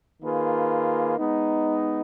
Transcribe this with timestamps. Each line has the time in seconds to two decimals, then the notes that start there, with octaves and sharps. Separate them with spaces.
0.22 D#3 A#3 F4 G#4 B4
1.17 G#3 B3 D#4